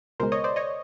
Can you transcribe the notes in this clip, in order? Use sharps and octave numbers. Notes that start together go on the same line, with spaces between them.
C#2 B2 G#3 A#4 C5
C#5 D#5
C5 D5
C#5 D#5